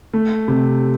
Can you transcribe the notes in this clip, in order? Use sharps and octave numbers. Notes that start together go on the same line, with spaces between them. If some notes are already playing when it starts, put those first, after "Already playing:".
A3
C3